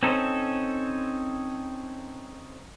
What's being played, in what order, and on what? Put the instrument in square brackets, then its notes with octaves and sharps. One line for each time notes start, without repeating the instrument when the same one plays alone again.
[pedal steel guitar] C4 C#4 D#4 A4